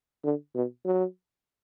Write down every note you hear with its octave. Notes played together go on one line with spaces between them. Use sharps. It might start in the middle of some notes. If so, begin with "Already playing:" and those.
D3
B2
F#3